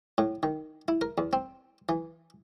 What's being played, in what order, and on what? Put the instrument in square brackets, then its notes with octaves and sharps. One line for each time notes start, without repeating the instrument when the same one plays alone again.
[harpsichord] A2
D#3
E4
A#4
E2
C4
E3